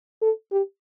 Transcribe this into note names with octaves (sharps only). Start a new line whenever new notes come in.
A4
G4